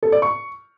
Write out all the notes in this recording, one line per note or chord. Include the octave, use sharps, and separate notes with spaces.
A4
D5
C#6